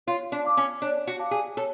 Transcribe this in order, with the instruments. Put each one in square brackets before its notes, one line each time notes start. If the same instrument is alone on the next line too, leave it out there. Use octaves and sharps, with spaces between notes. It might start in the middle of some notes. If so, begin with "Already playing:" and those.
[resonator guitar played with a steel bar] F4 [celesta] C#5
[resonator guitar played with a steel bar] D4
[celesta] F5 A5 D6
[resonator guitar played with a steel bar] C#4
[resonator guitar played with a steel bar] D4 [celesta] C#5
[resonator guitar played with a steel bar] F#4
[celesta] F5 A5 D6
[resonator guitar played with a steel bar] G#4
[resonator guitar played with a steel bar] A4 [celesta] C#5